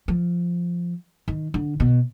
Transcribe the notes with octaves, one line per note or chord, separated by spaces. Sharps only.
F3
D#3
D3
B2